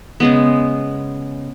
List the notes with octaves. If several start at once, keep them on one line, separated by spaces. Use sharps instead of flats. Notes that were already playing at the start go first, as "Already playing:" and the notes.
C#3 G#3 B3